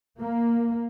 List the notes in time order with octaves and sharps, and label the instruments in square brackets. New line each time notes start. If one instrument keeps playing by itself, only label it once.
[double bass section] A#3